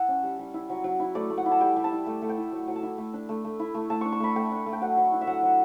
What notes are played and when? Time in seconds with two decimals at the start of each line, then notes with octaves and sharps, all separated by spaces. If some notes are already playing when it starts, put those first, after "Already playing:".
Already playing: E4 F#5 A5
0.08 C#4
0.23 G3
0.39 G3
0.54 E4
0.69 F#3
0.84 F#3
1.00 E4
1.15 A3 D5
1.30 A3
1.38 F#5
1.46 E4
1.51 A5
1.61 G3 G5
1.76 G3
1.84 A5
1.92 E4
2.06 A3
2.22 A3
2.29 G5
2.37 E4
2.52 F#3
2.68 F#3
2.76 A5
2.83 E4
2.98 A3
3.14 D4
3.29 A3
3.45 A3
3.59 E4
3.74 A3
3.90 A3 A5
4.01 D4 C#6
4.12 C#6
4.20 A3 B5
4.36 A3 G5
4.51 D4
4.66 A3
4.73 G5
4.81 F#3 F#5
4.97 F#3
5.12 E4
5.21 E5
5.27 F#3 F#5
5.42 F#3